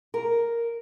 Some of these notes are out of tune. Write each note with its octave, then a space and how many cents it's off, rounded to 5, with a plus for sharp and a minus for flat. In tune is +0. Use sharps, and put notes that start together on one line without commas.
A#4 +0